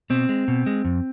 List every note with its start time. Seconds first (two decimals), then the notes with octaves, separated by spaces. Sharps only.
0.10 B2 C4
0.29 G#3
0.48 B2
0.66 G#3
0.84 F2